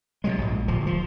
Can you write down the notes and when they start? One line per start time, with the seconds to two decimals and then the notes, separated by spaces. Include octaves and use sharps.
0.24 B2 F3 F#3 G#3
0.38 A#1 G#2
0.68 D1 F3
0.86 F3